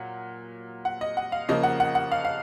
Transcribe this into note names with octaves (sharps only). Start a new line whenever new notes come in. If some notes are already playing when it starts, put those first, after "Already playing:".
Already playing: A#2 F#3 F#5
F#5
D#5
F#5
F5
C#3 F3 A#3 D#5
F#5
F#5
F#5
F5
F5